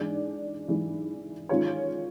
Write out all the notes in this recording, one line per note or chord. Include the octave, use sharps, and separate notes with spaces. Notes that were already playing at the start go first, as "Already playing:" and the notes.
Already playing: G#2 E3 G#3 D4 D5
G#2 E3 G#3
D#3 G#3 C#4 F4 C#5